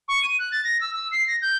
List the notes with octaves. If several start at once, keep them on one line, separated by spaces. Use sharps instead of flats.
C#6
D#7
F#6
A6
A#6
E6
E6
C7
A#6
G6